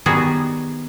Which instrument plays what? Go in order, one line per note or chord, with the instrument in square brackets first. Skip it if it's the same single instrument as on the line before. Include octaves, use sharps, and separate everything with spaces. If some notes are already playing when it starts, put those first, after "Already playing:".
[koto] D#3 G3 B3 F#4 G#4